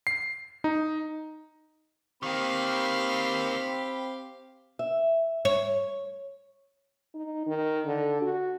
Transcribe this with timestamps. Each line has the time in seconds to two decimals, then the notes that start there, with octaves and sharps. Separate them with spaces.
0.07 C7
0.64 D#4
2.23 D#3 A#3 C4 G4 F5 B5
4.79 E5
5.45 C#5
7.15 D#4
7.47 D#3
7.86 D3
8.22 F#4